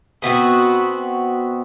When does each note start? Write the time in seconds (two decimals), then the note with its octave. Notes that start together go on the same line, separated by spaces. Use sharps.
0.22 B2 B3 C4 F#4